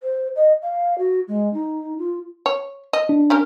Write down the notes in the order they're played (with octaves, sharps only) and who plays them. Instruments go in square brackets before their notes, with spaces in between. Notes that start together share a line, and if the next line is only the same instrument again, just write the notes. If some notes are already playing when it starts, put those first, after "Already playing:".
[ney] C5
D#5
F5
F#4
G#3
D#4
F4
[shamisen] C#5
D#5
[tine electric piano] D4
[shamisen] C#4 G4 A#4